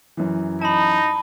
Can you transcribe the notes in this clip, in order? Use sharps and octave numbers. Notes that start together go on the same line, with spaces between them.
F#2 E3
D#4 A5 B5